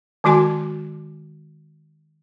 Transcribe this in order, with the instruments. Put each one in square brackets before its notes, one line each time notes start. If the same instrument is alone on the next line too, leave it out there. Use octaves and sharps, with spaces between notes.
[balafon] D#3 G#3 F#4 G#5 D6